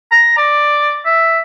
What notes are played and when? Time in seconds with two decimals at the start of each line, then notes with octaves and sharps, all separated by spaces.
0.12 A#5
0.37 D5
1.06 E5